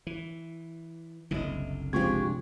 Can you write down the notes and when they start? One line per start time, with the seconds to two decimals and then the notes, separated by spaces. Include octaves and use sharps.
0.07 E3
1.31 F#1 C2 D3 E4 D#5
1.93 C3 F3 G#3 D4 F4 G4 C#6 G#6